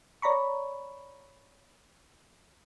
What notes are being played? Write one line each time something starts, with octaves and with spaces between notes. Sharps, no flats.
C#5 D5 A#5 B5 C#6